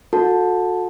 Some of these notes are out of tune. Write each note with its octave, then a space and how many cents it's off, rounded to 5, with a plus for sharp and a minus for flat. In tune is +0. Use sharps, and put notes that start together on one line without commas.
F#4 -35 A4 +0 A5 +0